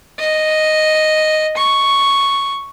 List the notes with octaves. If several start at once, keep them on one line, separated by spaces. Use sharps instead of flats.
D#5
C#6